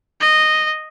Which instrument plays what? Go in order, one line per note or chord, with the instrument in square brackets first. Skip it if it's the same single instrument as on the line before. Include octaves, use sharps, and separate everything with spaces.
[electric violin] D#5